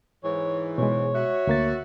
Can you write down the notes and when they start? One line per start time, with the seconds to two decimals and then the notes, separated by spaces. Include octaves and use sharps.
0.24 G#2 E3 C#5
0.78 B2 G#3 C#5
1.14 F#4 E5
1.47 D2 A#3 A6